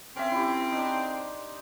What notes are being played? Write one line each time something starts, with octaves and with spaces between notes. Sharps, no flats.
C4 C#4 E5
E4 G4
D4 D#4
C6